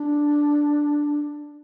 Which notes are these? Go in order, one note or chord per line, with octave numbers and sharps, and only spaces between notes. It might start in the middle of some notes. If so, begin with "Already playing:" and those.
Already playing: D4